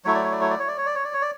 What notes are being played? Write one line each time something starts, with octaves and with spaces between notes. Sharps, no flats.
F#3 A3 E4 C#5
D5
C#5
D5
C#5
D5
C#5
D5
C#5
D5
C#5
D5
C#5
D5